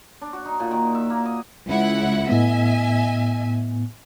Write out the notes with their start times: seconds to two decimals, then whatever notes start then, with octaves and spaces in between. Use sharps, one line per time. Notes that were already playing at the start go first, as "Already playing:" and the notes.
0.21 D4
0.33 F#4
0.45 D#4
0.60 A#2
0.71 D#3
0.95 E5
1.10 A#3
1.26 D#5
1.67 C#2 E4 F#5
2.29 A2 B3 D#5 E5 G#5